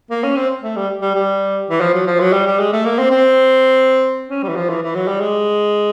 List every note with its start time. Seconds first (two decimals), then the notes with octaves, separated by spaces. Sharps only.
0.11 A#3
0.24 C#4
0.36 C4
0.62 A3
0.76 G3
1.02 G3
1.15 G3
1.70 E3
1.81 F3
1.94 F#3
2.07 F3
2.20 F#3
2.33 G3
2.46 G3
2.59 G#3
2.73 A3
2.85 A#3
2.99 C4
3.11 C4
4.29 C#4
4.43 G3
4.49 E3
4.56 F3
4.69 E3
4.82 E3
4.95 F#3
5.08 G3
5.21 G#3